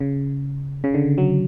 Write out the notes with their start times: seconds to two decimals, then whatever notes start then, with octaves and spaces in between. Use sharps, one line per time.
0.01 C#3
0.84 C#3
0.94 D3
1.18 F#3